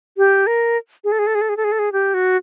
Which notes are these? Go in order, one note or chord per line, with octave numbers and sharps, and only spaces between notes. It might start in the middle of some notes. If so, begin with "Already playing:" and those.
G4
A#4
G#4
A4
G#4
A4
G#4
A4
G#4
A4
G#4
A4
G#4
G4
F#4